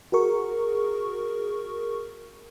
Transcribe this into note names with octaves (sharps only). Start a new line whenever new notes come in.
F#4 G#4 A#4 C#6